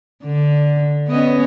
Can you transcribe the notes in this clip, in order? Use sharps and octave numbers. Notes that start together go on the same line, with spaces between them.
D3
B3 C#4 D#5